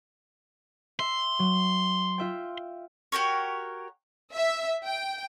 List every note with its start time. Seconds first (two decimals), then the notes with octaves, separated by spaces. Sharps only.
1.00 E5 C6
1.39 F#3
2.18 F4 E5 G5
3.12 F#4 G4 A#4 C#5
4.35 E5
4.83 G5